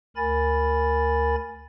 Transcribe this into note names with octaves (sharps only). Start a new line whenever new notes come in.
D2 A#4 G#5 B5 A6